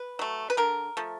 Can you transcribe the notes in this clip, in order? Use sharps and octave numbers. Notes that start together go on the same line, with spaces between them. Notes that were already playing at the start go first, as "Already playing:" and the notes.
Already playing: B4
F#3 A3
B4
D3 A#4
F3 A3